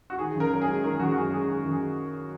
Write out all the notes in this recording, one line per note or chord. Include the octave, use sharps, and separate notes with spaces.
F#4
D#3 G#4
F#1
A#4
F#2 A#4
G#4
G#3
D#3 A#4
G#4
F#1 F#4
F#4
F#2 G#4
G#3 G#4
D#3 G#4
F#1
G#4